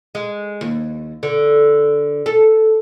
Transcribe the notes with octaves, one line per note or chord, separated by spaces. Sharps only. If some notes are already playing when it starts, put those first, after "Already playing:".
G#3
D#2
D3
A4